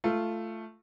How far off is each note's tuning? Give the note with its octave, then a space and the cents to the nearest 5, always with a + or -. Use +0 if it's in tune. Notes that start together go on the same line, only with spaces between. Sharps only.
A3 +0 F4 -15